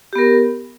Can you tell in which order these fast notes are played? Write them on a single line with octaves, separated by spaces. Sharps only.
G4 B3 A#4